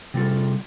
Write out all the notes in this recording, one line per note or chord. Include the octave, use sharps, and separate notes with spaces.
C3 G3 F4 A4